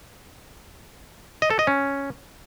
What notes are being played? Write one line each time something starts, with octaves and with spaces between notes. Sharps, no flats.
D#5
A4
D#5
C#4